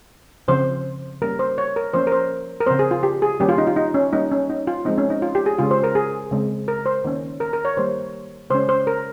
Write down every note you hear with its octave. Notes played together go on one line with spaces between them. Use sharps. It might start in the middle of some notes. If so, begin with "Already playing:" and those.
C#3 F3 C4 C5
G3 A#3 C#4 A#4
C5
C#5
A#4
F3 A#3 C#4 C5
A#4
C5
A#4
C#3 F3 C4 C5
G#4
F4
G4
G#4
D#3 G3 A#3 C#4 G4
F4
D#4
F4
D#4
C#4
G3 A#3 C#4 D#4
C#4
D#4
F4
F3 G#3 C4 D#4
C#4
D#4
F4
G4
G#4
C#3 G#3 C#4 F4
C5
A#4
G#4
C#3 G#3 C4
A#4
C5
D#3 A#3 C#4
A#4
A#4
C#5
D#3 G3 A#3 C5
C#3 G#3 C#4 C5
C5
A#4